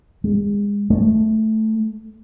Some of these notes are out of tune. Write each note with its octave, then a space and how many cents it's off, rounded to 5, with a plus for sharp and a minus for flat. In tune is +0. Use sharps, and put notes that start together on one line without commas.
G#3 -30
A3 -5